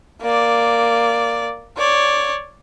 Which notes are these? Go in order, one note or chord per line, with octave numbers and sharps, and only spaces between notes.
A#3 D5
C#5 D5